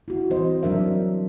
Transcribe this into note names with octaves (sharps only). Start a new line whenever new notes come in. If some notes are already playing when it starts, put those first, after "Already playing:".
E4 F#4
E3 G3 C4 C5 D#5
F#3 D4 A#4 E5